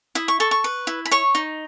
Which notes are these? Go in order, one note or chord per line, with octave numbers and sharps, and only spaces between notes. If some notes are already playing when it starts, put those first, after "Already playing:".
E4 D#6
C#6
A4 C#6
C#6
B4
E4
B5
C#5 C#6
D#4